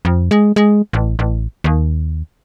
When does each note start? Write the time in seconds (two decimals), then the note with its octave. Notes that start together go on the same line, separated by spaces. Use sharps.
0.05 F2
0.31 G#3
0.56 G#3
0.93 A1
1.19 A1
1.64 D#2